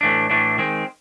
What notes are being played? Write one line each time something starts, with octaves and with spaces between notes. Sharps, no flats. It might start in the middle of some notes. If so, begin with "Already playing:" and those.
A2 E3 A3 D4
A2 E3 A3 D4
D#3 G#3 C4